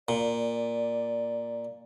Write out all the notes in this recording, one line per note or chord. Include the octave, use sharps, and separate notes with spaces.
A#2 D5